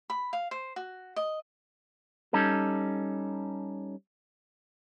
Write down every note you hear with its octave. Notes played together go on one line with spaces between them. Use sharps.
B5
F5
C5
F#4
D#5
G3 C#4 D#4 A4